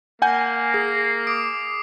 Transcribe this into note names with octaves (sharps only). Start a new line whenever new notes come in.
A#3 F#5 G#5 G6
G#4 C7
D6 D#6 D7